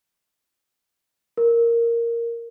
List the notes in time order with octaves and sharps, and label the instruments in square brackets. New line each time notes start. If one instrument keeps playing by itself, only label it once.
[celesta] A#4